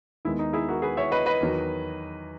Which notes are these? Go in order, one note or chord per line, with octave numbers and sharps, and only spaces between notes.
D#2 D#3 G#3 B3 E4
D#4
E4 G#4
F#4 A#4
G#4 B4
C#5 E5
B4 D#5
B4 D#5
E2 D#3 F#3